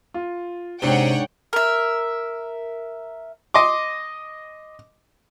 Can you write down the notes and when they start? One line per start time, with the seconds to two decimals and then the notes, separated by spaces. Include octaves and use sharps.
0.14 F4
0.82 G#2 C3 D4 C#5 F#5 G5 G7
1.53 A#4 E5
3.54 D#5 C6 D6